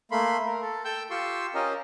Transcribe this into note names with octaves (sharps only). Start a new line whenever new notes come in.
A3 A#3 B5 C6
A#4
A4
A4 G5 E6 G6
F4 G4 C6 C#6 E6
C#4 F4 G4 A#4 D#5